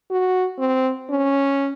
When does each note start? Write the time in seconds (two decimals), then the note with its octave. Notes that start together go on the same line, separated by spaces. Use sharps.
0.11 F#4
0.59 C4
1.10 C#4